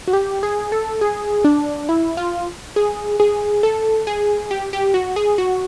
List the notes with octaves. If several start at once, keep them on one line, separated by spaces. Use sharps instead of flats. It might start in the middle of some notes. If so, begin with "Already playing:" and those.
F#4
G4
G#4
A4
G#4
D4
E4
F4
G#4
G#4
A4
G#4
G4
G4
F#4
G#4
F#4